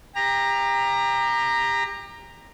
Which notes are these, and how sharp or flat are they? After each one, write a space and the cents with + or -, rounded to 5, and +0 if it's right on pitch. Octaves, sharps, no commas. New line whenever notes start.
G4 +30 A#5 +0